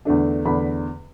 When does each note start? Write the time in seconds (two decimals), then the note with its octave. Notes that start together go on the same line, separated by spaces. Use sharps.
0.05 E2 D3 A3 D4
0.45 E2 D3 A3 D4 B5